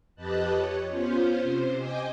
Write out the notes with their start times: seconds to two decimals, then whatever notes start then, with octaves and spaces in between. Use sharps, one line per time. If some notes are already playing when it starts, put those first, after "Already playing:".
0.15 F2 G4 B4 D#5 A5 F#6
0.53 C#5
0.89 B3 C#4 F4 C5
1.37 C3 C5
1.75 D#5 G5 G#5 D6